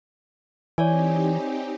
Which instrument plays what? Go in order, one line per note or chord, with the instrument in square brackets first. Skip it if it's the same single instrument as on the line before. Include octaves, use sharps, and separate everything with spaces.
[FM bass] E3 [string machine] C4 D#4 G4 [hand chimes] C#5 D5 G#5